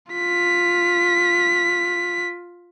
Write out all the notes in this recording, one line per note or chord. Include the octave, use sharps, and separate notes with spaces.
F4 B6